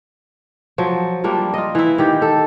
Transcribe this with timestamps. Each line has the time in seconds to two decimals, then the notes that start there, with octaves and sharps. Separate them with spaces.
0.78 F3 F#3
1.24 F3 G3 A#3 D4
1.54 F4 D#5
1.75 E3 E4
1.98 D#3 G4
2.22 A4